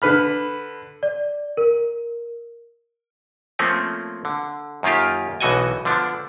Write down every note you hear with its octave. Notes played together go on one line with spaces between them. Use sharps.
D3 B4 B5 F6
D5
A#4
F3 A3 A#3 C4 C#4
D3
F#2 D#3 A#3 F4 G4
B1 B2 E3 F#4 D#5 G#5
D3 F3 B3 D4